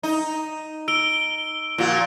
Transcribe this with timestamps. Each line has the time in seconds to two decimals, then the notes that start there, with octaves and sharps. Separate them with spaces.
0.03 D#4
0.88 A#4 E6 D7 G7
1.78 A#2 F3 F#4 F5